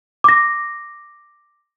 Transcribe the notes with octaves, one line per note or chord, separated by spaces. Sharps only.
D6 A#6